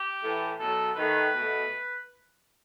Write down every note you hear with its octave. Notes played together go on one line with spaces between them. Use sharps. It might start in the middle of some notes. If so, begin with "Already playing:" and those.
Already playing: G4
A2 E3 A3
B2 F#3 A3 A4
D#3 A3 B4
B2 A3